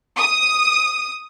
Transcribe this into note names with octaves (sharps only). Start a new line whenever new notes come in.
D#6